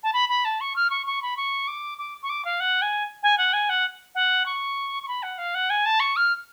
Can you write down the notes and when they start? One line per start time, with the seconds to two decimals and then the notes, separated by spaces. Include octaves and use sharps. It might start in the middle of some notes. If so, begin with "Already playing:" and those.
0.03 A5
0.13 B5
0.29 B5
0.44 A5
0.60 C#6
0.76 F6
0.90 C#6
1.06 C#6
1.22 B5
1.37 C#6
1.67 D6
1.98 D6
2.22 C#6
2.29 D6
2.44 F5
2.60 F#5
2.81 G#5
3.22 G#5
3.37 F#5
3.53 G#5
3.69 F#5
4.14 F#5
4.45 C#6
5.02 C#6
5.08 B5
5.22 F#5
5.38 F5
5.54 F#5
5.69 G#5
5.85 A5
5.99 C#6
6.16 F6